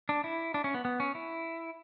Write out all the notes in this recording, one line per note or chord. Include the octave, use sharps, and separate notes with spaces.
D4
E4
D4
C#4
B3
B3
C#4
E4